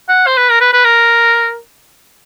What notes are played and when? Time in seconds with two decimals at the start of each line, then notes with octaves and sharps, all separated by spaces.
0.08 F#5
0.27 C5
0.37 B4
0.49 A#4
0.61 B4
0.73 B4
0.84 A#4